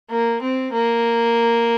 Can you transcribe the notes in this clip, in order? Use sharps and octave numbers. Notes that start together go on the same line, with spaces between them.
A#3
C4
A#3